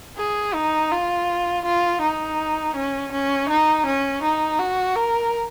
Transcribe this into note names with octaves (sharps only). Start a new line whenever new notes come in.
G#4
D#4
F4
F4
D#4
C#4
C#4
D#4
C#4
D#4
F#4
A#4